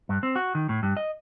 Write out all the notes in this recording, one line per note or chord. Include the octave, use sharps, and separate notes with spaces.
G2
C4
F#4
D#3
A2
G2
D#5